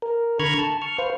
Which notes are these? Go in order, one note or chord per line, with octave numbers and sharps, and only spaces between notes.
A#4
D3 A#5 B5 C#6 F6 G#6
A5
C#6 F6
B4 C5 F5